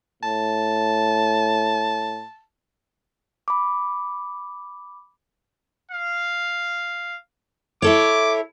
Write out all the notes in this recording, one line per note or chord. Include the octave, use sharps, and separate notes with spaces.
A2 A5
B5 D6
F5
E4 A4 C#5 D6